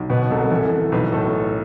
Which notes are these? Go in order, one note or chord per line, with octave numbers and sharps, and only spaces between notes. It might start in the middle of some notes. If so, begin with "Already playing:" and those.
Already playing: B1
B2 B4
C2 A4
E3 A4
E3
B1 B4
A2 A4